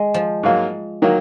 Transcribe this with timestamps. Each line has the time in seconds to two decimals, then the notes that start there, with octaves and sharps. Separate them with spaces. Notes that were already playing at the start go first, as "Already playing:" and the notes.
Already playing: G#3
0.14 F3
0.43 G#2 F#3 A#3 F4
1.02 D#3 F#3 A#3